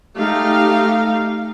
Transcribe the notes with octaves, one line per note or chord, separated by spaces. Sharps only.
A3 D#4 G4 F5